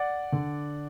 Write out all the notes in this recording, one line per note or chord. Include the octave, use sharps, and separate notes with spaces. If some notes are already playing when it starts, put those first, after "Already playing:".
Already playing: D5 F#5
D3